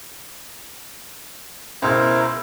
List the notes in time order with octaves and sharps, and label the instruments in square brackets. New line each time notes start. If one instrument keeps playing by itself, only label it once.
[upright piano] C#2 B2 E6 [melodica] E4 A#4 C5